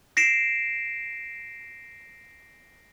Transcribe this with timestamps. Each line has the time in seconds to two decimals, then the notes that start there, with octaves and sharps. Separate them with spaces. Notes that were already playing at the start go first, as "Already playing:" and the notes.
0.17 A#6 C7 D7 E7